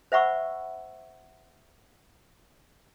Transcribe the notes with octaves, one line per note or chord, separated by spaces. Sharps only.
C5 E5 F#5 B5 C#6 E6